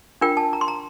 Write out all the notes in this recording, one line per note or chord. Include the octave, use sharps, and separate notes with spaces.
D4 F4 A#4 G5
A5
A#5
C6
A#5